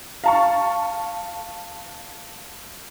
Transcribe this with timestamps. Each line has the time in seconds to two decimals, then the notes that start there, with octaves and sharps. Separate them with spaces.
0.24 F5 A5 C#6